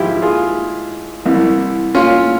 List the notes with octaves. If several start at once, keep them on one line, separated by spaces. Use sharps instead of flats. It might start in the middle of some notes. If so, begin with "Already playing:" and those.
Already playing: G#1 G#2 F3 E4 G4
F4 G#4
C2 C3 E3
C#4 F4